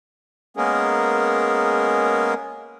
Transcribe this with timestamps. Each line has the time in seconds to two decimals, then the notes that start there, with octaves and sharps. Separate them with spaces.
0.57 G#3 A#3 B3 C#4 G#4 A#4